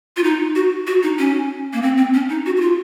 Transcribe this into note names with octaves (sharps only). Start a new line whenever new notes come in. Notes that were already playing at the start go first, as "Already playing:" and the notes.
F4
D#4
F#4
F#4
D#4
C#4
A#3
C4
C4
C#4
D#4
F#4
F#4
F4